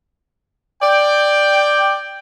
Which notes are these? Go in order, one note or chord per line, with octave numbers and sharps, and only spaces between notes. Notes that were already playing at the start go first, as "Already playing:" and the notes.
D5 G5